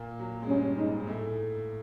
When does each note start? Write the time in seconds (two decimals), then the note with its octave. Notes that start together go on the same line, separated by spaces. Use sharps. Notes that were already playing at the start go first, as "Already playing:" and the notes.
Already playing: A#2 A#3
0.19 F#3
0.42 G#3
0.48 G2 G3 C#4
0.77 G#2 G#3 D#4
1.00 G#3
1.07 A2 A3